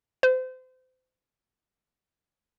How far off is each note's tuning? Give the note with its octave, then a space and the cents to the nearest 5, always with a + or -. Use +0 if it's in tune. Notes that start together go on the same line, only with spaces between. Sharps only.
C5 -35